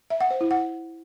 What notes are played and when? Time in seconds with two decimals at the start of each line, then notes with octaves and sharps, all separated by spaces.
0.10 E5
0.20 F#5
0.31 C5
0.41 E4
0.51 F#5